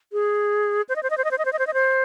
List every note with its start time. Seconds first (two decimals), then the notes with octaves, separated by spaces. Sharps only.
0.13 G#4
0.89 C5
0.96 D#5
1.03 C5
1.10 D#5
1.18 C5
1.24 D#5
1.31 C5
1.38 D#5
1.45 C5
1.53 D#5
1.59 C5
1.67 D#5
1.74 C5